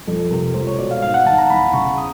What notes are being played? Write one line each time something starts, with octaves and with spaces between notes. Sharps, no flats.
F2 A4
C3 A#4
C#2 C5
C#5
B2 D5
F5
G#2 F5
F#5
D#3 A5
A#5
E2 B5
C#3 C#6
D#6